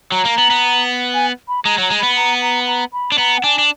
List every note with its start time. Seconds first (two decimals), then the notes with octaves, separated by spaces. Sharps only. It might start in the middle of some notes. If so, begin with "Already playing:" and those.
0.12 F#3 A#5
0.25 A#3
0.38 B3
0.50 B3
1.14 G#5
1.48 B5
1.65 G#3 A#5
1.78 F#3 A#5
1.90 G#3
1.99 B3 B5
2.16 A#5
2.42 A#5
2.67 A#5
2.93 B5
3.12 D4
3.18 B3 A#5
3.38 F#5
3.44 D4 G#5
3.59 D4